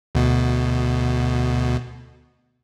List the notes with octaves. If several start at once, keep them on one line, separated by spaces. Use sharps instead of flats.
D2 B2